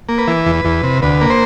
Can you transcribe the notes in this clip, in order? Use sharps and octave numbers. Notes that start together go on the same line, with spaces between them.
A#3
B4
E3
E2
E2
C3
D2 B4
A#3
C5